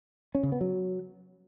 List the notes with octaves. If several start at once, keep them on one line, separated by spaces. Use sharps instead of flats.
C#4
C#3
B3
F#3